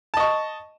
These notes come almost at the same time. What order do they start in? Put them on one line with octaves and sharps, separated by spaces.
A5 D#5 C#6